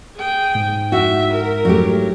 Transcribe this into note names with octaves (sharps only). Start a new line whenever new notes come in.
G#4 G5
G#2
F#4 E5
A#4
F#3 A3 G4